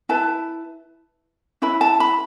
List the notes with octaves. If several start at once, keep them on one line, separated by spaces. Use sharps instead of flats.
E4 B4 A5
C#4 E4 B4 B5
A5
B5